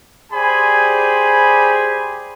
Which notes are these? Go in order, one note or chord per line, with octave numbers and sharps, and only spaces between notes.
G4 G#4 C5 D5 G#5 B5